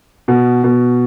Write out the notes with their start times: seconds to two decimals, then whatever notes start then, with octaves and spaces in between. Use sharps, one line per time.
0.28 B2
0.64 B2